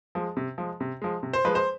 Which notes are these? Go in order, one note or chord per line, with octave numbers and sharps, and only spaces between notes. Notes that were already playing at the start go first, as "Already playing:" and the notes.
F3 G#3
C3
F3 G#3
C3
F3 G#3
C3
C5
F3 G#3 B4
C5